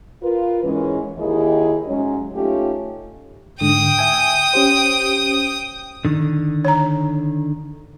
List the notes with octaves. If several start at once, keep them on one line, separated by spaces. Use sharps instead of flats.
F4 A#4 B4
G#2 E3 G#3 C#4
D#2 D#3 E4 G4 G#4 D#5
G#2 F#3 G#3 C#4
A3 C#4 D#4 F4 G4
G#2 D3 G5 D#6
E5 G#5
C#4 G4 C5
D3 D#3
C#5 A#5